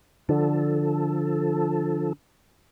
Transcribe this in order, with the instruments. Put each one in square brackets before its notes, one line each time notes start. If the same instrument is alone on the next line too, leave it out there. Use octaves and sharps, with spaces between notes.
[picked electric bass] D3 [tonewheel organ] F3 A4